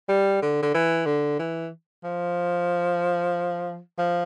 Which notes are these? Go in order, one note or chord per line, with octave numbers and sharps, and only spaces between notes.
G3
D3
D3
E3
D3
E3
F3
F3